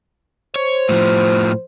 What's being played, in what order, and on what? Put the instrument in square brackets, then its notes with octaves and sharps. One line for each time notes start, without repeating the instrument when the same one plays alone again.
[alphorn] C5 [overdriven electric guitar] C#5
[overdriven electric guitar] A2 F3